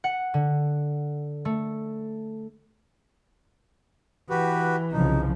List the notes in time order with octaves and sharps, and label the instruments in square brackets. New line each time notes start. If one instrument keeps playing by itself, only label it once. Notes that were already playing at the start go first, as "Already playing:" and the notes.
[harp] F#5
D3
A3
[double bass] E3 [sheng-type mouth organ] F#4 G4 B4
[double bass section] C2 C#3 F3 [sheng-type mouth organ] D#4